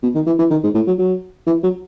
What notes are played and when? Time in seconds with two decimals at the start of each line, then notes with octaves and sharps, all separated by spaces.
0.03 B2
0.15 D#3
0.26 E3
0.39 E3
0.51 D#3
0.64 G#2
0.75 A2
0.87 F#3
0.99 F#3
1.47 E3
1.63 F#3